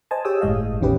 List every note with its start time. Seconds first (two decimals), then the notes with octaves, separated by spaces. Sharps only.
0.11 C5 D#5 G#5 A5
0.25 G4 G#4 C#5 G5 D#6 E6
0.41 G1 A2 G#3 D#5 F5
0.81 A1 E2 D#3 C#4 G4 B4